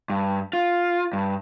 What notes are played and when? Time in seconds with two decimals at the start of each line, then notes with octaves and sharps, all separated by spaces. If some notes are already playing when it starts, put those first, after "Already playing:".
0.10 G2
0.53 F4
1.13 G2